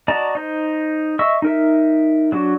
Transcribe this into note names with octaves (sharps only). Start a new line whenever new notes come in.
F#4 D5 D#5 A5 A#5
D#4 C5
D#5 E5 C#6 E6
D#4 A#4 E5
F#3 D4 F#4